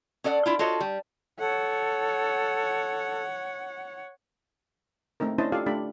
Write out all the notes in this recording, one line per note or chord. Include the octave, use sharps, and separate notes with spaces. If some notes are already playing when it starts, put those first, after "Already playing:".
C#4 A4 D5 D#5 F#5
D4 E4 F4
F4 F#4 A4 C#5 D#5
G3
A4 C#5 F#5
A3 C4 D#4 A#4
C#4 D4 E4 C5 D#5 A5
F4 G4 A4 D5 F5
A3 D4 G4 D5 B5